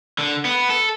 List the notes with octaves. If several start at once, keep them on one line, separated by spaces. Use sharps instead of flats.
D3
B3
A4